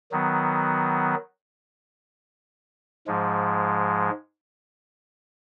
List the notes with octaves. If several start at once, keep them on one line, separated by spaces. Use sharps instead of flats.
D#3 F#3 B3
G#2 F3 G#3